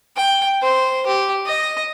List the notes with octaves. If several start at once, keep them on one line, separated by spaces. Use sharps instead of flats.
G5
C5
G4
D#5